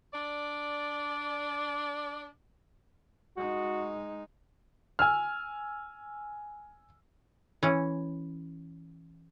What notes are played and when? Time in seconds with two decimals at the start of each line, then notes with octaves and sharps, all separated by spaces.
0.13 D4 D5
3.37 G#3 D#4 F#4
4.99 G#5 E6 F6
7.63 E3 C#4